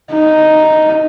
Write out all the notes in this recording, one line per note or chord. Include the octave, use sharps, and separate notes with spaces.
D#4